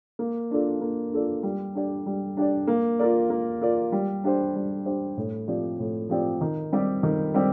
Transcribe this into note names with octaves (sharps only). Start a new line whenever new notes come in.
A#3
D4 F4 A4 D5
A#3
D4 F4 A4 D5
G3
D4 G4 D5
G3
D4 G4 D5
A#3
F4 A#4 D5
A#3
F4 A#4 D5
G3
D4 G4 C5
G3
D4 G4 C5
A2
F3 C4 G4 D5
A2
F3 C4 G4 D5
D#3
G3 C4 G4
D#3
G3 C4 G4